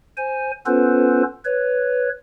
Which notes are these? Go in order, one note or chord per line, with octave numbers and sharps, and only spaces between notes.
C5 G#5
B3 C#4 F4 A4 B4 C5
B4 C#5